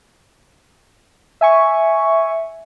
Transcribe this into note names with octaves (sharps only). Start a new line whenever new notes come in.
E5 G#5 C#6